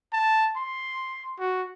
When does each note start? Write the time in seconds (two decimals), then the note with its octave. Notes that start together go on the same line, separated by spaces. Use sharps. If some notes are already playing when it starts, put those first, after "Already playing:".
0.13 A5
0.56 C6
1.39 F#4